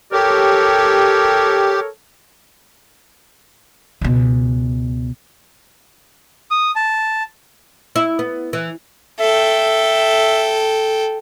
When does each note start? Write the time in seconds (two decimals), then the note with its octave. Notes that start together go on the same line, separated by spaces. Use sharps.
0.12 G4 A4 A#4 C#5
4.01 C#2 B2
6.51 D#6
6.76 A5
7.96 E4
8.19 B3
8.53 E3
9.20 A4 E5 G5